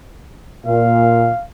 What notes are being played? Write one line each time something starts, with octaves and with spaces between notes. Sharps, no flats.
A#2 F5